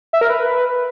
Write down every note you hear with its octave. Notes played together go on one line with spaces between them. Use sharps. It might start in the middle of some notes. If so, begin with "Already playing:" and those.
E5
A#4
B4